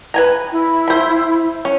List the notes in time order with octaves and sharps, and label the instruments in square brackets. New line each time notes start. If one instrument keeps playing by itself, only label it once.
[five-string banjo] B4 G#5 A#5
[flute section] E4
[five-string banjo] C5 B5
C#4